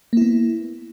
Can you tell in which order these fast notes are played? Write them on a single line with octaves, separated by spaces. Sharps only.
A#3 E4 B3